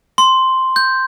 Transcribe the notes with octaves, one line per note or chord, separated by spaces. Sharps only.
C6
G6